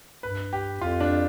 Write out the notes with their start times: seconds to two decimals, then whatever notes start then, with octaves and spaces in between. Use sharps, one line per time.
0.23 G2 B4
0.53 G4
0.81 F2 F4
1.01 D4